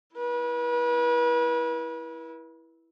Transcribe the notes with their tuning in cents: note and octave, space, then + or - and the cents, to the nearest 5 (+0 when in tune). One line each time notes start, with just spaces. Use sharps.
E4 +0 B4 -35